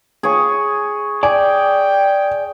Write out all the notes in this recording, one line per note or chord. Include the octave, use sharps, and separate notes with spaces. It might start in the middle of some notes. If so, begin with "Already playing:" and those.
G#4 C#5
D5 G5 G#5